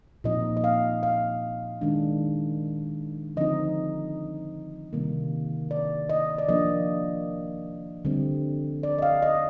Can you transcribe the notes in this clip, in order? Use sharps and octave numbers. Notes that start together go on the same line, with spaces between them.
A#2 F3 C4 D#4 D#5
D#5
F5
F5
D#3 G#3 D4
D3 F3 C4 D#4 D#5
C3 D#3 G3 A#3
D5
D#5
D5
F3 A#3 D4 D#5
D3 G3 C4
D5
D#5
F5
D#5